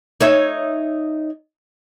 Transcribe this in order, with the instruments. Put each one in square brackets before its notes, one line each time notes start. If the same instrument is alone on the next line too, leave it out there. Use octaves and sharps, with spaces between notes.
[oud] D#4 C#5 E5